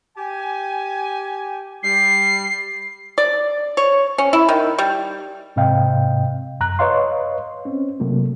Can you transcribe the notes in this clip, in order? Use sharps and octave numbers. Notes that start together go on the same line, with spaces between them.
G4 G#5
G3 C7
D5
C#5
C#4
E4
D#3
G3
G#2 C3 C4 D#5 F5 G5
F#2 A#5 F#6
B4 C#5 D#5 F5 C6
C4 C#4
C3 F#3 A3 A#3